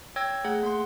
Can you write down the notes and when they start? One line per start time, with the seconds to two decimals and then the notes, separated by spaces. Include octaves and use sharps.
0.16 C#5 G5 E6 G#6 A#6
0.44 A3 G#4 F#5
0.63 A#3 F#5 C6